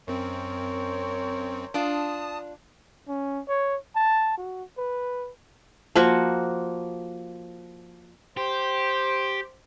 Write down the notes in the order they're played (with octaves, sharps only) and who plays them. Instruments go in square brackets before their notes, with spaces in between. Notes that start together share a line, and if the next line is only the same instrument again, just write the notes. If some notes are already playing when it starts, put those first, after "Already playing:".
[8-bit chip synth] F#2 C4 [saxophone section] A#4 C5 C#5
[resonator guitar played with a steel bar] D4 F4 [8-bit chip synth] A5 D#6
[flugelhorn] C#4
C#5
A5
F#4
B4
[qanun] F3 A#3 F#4 C#6
[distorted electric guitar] G4 [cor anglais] C5